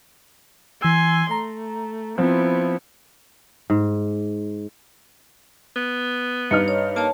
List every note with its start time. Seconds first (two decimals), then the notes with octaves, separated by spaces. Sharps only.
0.82 E3 G#5 C6 E6
1.31 A3 A#5
2.18 F3 B3 C4 E4
3.70 G#2
5.76 B3
6.51 G2 D#4 B4 F6 C#7
6.68 C#5
6.96 A#3 C#5 A5